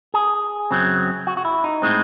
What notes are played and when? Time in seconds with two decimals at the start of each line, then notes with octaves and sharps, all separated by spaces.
0.14 G#4
0.71 F#2 C#3 F#3 C4
1.27 F#4
1.37 F#4
1.45 E4
1.64 D#4
1.82 A2 G#3 C4